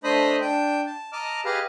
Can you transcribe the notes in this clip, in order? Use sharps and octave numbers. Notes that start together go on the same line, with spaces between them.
A3 D4 C5 D#5 B5 D#6
D4 G5
A5
D#5 A5 A#5 D6 F6
G4 G#4 B4 D#5 F5